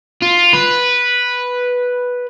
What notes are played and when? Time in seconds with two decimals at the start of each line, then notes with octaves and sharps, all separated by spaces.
0.22 F4
0.53 B4